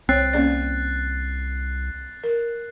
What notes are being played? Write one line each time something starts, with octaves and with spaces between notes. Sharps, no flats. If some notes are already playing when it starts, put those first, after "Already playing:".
C2 C4 C#5 F#6 A6 C7
A#3 C#4 D5
A#4